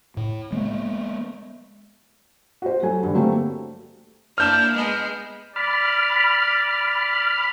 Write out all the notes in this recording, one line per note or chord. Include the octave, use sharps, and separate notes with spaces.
A2
G#3 A#3 B3
F#4 C5
F#3 A4 G#5
G2 D3
F#3 A3 A#3 C4 G4
A#3 D4 E4 F6 G6 E7
G#3 B3 G#4
D5 B5 F6